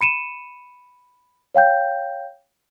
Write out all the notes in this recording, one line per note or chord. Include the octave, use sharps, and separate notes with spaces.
B5 C#7 D#7 E7
C#5 F5 G5 G6